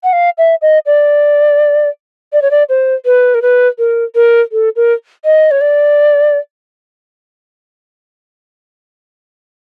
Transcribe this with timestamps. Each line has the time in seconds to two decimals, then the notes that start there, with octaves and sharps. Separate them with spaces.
0.04 F#5
0.13 F5
0.38 E5
0.62 D#5
0.86 D5
2.33 D5
2.42 C#5
2.51 D5
2.69 C5
3.05 B4
3.34 A#4
3.42 B4
3.78 A#4
4.15 A#4
4.52 A4
4.76 A#4
5.25 D#5
5.51 C#5
5.61 D5